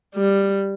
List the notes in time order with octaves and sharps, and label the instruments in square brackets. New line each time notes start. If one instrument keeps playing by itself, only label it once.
[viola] G3